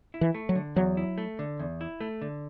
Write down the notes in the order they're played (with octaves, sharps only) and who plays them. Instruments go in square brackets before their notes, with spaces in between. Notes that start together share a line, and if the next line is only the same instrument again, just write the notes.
[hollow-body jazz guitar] E4
[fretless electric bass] E3
[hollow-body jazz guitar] A3
[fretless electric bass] F#3
[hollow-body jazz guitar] D3
[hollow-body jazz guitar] E2 [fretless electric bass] F#3
[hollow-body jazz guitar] E4
A3
D3
E2
E4
A3
D3